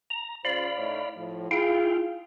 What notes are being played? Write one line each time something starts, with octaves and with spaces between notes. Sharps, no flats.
A#5
C#3 F4 C5 D5 F5 B5
A2 D#4 C#5
A2 F3
E4 F4 G#4 F5 G5